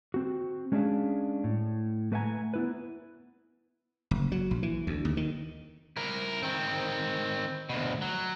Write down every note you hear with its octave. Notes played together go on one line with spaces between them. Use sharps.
C4 F#4
G#3 C#4 D4 G#4 E5 F5
A2
A3 B4 E5 F#5 G#5 A#5
B3 E4 B4
F#1
F#3
A#1
E3
D2
D#2
D#3
E4 A#4
D#3 C4
D2 B2
F#3